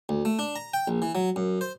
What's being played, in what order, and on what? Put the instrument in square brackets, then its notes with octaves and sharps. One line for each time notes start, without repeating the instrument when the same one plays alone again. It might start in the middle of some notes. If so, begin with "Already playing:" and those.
[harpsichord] D2
A3
D4
A#5
G5
A#1
E3
F#3
F#2
C5